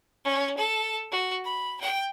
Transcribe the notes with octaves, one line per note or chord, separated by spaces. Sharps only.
C#4
A4
F#4
B5
G5